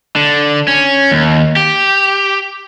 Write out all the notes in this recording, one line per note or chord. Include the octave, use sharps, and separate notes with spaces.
D3
C#4
D#2
G4